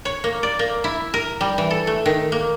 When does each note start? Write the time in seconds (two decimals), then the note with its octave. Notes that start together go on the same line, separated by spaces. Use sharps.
0.05 C#5
0.24 A#3
0.43 D5
0.59 A#3
0.84 E4
1.14 A#4
1.41 G3
1.58 E3
1.71 A4
1.87 A3
2.06 D#3
2.32 A#3